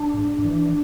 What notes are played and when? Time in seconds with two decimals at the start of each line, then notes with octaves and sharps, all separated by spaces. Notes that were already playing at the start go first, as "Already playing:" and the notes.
Already playing: D4
0.14 G#2
0.44 E3